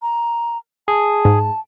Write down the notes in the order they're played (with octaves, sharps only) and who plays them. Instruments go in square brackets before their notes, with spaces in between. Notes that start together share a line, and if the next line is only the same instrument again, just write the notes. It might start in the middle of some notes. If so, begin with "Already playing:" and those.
[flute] A#5
[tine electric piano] G#4 [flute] A5
[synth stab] G#2